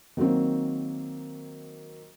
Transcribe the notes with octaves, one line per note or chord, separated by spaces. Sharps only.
D#3 F#3 A#3 C4